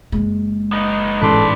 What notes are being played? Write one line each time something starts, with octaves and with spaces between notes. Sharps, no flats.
F#1 G#3
B3 D#4
A1 G#2 A4 B4 D5 C6